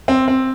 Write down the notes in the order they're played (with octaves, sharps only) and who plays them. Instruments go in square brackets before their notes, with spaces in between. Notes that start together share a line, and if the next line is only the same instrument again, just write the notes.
[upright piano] C4
C4